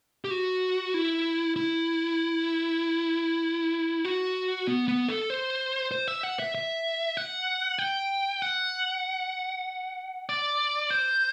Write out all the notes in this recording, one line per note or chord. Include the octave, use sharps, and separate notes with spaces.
G4
F#4
E4
E4
F#4
B3
B3
A4
C5
C5
E5
F#5
E5
E5
F#5
G5
F#5
D5
C5